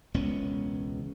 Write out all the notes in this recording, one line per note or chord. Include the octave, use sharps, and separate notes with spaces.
E1 C#2 B3 C#4